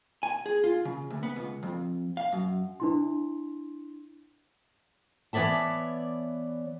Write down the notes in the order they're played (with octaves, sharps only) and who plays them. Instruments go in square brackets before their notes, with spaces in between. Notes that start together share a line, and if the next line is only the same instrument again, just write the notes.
[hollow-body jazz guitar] G#5
G#4
F4
C#3
D2
B3
C#2
F2
F5
F#2
[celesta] D4 E4 C6
[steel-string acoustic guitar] E3 B3 C#5 D5 E5 A5